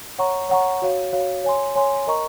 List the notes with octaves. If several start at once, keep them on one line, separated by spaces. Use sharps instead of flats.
C#5 F#5 A#5 C#6
C#5 F#5 A#5 C#6
F#4 C#5 F5
F#4 C#5 F5
C#5 G#5 C6
C#5 G#5 C6
A#4 D#5 A#5 C#6